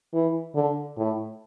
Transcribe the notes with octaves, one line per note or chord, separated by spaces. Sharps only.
E3
D3
A2